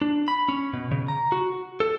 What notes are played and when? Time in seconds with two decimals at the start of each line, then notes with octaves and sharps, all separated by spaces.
0.02 D4
0.28 B5
0.49 C#4
0.73 B2
0.91 C#3
1.08 A#5
1.32 F#4
1.80 A4